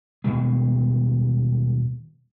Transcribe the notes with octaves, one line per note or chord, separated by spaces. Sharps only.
D#1 B2 G#3